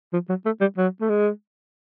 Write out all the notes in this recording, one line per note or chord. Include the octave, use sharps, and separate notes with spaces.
F3
F#3
A3
G3
F#3
A3
G#3